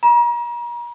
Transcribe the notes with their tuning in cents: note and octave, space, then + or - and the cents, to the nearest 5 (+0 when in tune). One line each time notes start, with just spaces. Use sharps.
A#5 +40